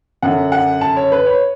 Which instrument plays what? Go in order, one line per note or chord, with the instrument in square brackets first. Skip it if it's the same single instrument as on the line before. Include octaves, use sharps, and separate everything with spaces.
[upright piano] F#2 D3 F#5
F#5
A5
C#5
B4
C#5